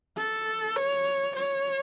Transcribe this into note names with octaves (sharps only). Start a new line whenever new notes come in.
A4
C#5
C#5